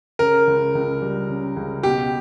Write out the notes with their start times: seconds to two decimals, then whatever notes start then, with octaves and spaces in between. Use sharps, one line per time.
0.19 C#3 A#4
0.47 C#2
0.75 C#2
1.02 G3
1.29 C#3
1.56 C#2
1.83 B2 G4